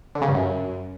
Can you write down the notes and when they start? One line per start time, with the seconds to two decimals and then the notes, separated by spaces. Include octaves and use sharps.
0.15 D3
0.22 C#3
0.28 G2
0.35 F#2